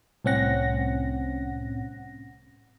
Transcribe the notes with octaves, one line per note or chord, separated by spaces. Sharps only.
C2 A2 C4 C#4 F#5 A#6